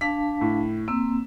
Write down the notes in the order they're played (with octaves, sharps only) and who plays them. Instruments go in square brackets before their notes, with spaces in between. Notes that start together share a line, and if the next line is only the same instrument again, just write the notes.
[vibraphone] D4 F5 A5 [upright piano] B6
[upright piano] A2
[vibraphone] A#3 C4 [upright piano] E6